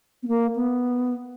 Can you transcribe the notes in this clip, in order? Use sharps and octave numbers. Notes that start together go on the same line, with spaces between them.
B3
A#3
B3